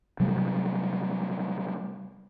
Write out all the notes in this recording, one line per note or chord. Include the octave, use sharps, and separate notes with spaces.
C3 F#3 G3 A3